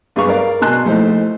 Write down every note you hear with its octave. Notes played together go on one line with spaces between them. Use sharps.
G2 B3 G#4 B4 F5 C#6
A#4 D5 F5
B2 G#5 A5 C6 F#6
A#1 A3 D#4 E4 C5